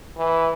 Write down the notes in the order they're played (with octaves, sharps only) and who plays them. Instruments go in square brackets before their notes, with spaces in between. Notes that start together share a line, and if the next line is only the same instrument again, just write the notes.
[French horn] E3